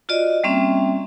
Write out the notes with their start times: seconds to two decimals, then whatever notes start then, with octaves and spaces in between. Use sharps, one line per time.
0.09 F4 F#4 D5 D#5
0.44 G3 A#3 C4 C#4 E5